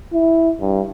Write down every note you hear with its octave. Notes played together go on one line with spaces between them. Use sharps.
E4
G2